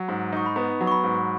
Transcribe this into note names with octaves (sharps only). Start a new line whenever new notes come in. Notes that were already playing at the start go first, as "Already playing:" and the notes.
Already playing: F#3
G#2
D#4 C#6
B5
B3 A#5
F#3
C#6
B5
G#2